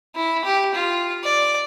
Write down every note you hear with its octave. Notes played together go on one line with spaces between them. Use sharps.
E4
G4
F4
D5